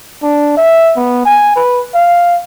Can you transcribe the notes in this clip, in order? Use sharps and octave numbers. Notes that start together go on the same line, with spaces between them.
D4
E5
B3
G#5
B4
F5